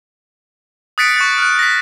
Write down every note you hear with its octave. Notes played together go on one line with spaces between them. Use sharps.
D#6 F#6 A6 B6 C#7 D7
C#6 F#6 A6
F6 F#6
A#6 B6